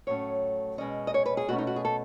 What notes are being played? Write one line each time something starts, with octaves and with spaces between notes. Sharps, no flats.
A2 F#3 A3 C#4 C#5
B2 G#3 C#4 D#5
D#5
C#5
B4
G#4
B2 A3 C#4 F#4
D#4
F#4
G#4
A4